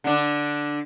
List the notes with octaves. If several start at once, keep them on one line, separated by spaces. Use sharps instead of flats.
D3 D4